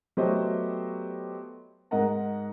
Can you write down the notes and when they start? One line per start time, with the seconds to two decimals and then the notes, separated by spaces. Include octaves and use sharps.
0.17 F#3 A3 B3 G4 C5 D#5
1.91 G#2 A#4 D#5 F#5 A#5